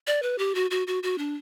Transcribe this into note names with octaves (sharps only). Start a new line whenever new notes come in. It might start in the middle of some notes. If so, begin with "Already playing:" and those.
D5
B4
G4
F#4
F#4
F#4
F#4
D4